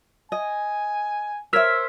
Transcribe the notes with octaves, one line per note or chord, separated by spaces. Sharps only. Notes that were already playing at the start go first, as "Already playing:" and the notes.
D#5 G#5
A#4 C5 C#5 E5 E6 F6 B6